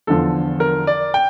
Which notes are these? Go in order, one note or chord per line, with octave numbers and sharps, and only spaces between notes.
E2 D3 F3 A4
A#4
D5
G5